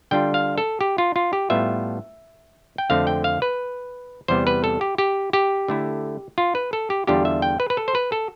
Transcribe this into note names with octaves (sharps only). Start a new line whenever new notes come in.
D3 G3 D4 F4 G5
F5
A4
G4
F4
F4
G4
A2 G3 B3 F4 E5
G5
F2 D3 A3 C4 F5
G5
F5
B4
E2 C3 G3 B3 C5
B4
A4
G4
G4
G4
D3 A3 E4
F4
B4
A4
G4
E2 D3 G3 D4 F4 G4
E5
G5
B4
B4
A4
C5
B4
A4